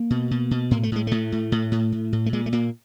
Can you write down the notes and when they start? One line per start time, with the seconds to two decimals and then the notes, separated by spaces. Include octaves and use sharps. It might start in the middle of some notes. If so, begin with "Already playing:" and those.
Already playing: A#3
0.10 B2
0.31 B2
0.51 B2
0.71 A2 A#3
0.83 A3
0.92 A2 G#3
1.07 A2 A3
1.32 A2
1.52 A2
1.72 A2
1.92 A2
2.13 A2
2.26 A3
2.33 A#2 G#3
2.46 A3
2.52 A#2 A#3